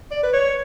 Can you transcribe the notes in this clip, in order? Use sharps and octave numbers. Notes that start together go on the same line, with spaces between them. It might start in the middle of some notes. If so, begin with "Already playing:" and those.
D5
B4
C#5